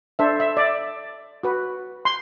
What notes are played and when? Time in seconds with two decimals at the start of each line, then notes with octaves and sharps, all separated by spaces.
0.19 D4 A4 C5 E5
0.40 E5
0.57 D5
0.61 E5
1.43 F#4 B4
2.05 C6